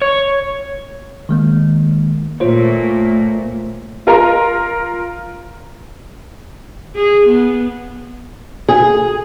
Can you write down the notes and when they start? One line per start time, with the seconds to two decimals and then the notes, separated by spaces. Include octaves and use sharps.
0.02 C#5
1.29 D#3 G#3 A#3
2.40 A#2 A3 A#3 F4 C5 C#5
4.07 F4 A#4 A#5
6.96 G#4
7.27 B3
8.69 G#4